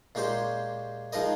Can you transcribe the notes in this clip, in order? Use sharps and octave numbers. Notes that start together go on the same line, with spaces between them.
A#2 G#3 C#4 G4 C5
F3 G#3 D#4 A#4 D#5